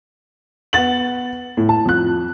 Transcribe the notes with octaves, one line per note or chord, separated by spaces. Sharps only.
B3 F#5 A6 F#7
A2
A5
F2 F#6